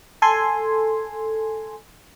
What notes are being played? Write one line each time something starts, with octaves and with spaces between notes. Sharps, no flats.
A4 G#5 C6